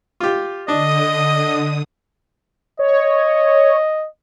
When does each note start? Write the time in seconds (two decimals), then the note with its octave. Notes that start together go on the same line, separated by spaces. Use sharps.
0.20 F4 G4
0.68 D3 D4 D#5 D#6
2.79 C#5 D#5